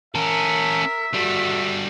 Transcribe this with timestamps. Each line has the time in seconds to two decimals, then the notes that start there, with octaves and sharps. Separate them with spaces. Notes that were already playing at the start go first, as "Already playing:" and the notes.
0.15 C#4 A4 A#4 E5
1.14 G3 F#4 A4